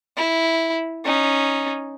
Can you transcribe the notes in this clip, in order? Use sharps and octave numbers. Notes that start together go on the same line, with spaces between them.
E4
C#4 D#4